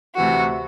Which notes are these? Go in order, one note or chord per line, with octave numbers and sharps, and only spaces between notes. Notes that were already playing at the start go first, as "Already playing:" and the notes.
D2 C3 E3 F#4